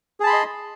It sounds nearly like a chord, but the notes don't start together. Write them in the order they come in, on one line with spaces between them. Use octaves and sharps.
G#4 A5 B5 C6 D#5